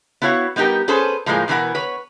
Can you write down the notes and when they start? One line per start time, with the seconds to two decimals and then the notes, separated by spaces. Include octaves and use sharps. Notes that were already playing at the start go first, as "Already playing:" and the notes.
0.22 B3 E4 F#4 C#5 F5
0.56 G3 B3 D#4 G4 A#4
0.88 C#4 G#4 A4 B4 C5
1.26 A2 F3 G#3 A#3 G#5
1.48 B2 E3 A#4 B4 F#5
1.75 B4 C#5